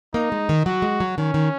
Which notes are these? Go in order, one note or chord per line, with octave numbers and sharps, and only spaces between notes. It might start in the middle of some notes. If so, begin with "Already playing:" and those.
A#3 D#4
G#3
D#3
F#3 F#4
G#3
F#3
D#3 C#4
D#3